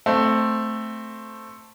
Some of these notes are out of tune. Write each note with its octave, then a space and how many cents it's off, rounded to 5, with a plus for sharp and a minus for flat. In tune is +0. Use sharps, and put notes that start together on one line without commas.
A3 +0 C4 +0